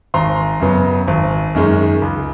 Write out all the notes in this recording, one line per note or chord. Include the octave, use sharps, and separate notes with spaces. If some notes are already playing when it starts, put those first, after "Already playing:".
G#1 A#5 C6
F#2 C#3 F#3 B3
G#1
F#2 D#3 G#3 C#4
C#2